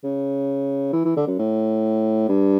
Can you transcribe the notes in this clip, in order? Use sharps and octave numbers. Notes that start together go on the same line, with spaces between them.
C#3
E3
E3
D3
F#2
A2
G2